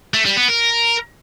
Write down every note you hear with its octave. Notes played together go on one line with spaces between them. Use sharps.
A3
G3
B3
A#4